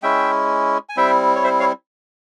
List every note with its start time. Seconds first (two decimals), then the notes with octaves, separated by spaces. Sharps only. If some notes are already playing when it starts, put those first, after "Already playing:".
0.03 G#3 C#4 E4 E5 G5
0.89 G#5
0.97 G3 C4 E4 E5 G5
1.36 C#5
1.44 C5 E5
1.60 C#5 F5